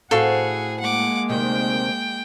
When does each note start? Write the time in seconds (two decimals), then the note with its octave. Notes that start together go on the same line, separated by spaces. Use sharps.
0.11 A2 C4 F#4 G#4 A4 F5 F#5 C#6
0.80 G#3 A#3 F#5 D6
1.30 D2 C3 D#3 G5